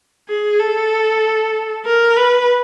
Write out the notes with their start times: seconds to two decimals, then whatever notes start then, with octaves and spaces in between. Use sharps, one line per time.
0.29 G#4
0.60 A4
1.85 A#4
2.16 B4